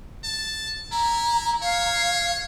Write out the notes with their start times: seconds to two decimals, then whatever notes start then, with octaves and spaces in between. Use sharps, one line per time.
0.24 A5
0.92 E4 A#5
1.62 C#5 F5